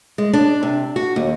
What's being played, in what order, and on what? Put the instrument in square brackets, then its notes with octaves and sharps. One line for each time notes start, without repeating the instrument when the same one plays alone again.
[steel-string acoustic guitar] G#3
D4
C3
F#4
D#2